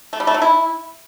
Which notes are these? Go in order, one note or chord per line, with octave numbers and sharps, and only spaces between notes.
A3
G3
A3
F#3
E4